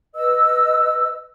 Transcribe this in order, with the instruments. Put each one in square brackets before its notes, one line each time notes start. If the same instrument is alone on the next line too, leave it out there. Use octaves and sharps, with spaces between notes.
[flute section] B4 D#5 E6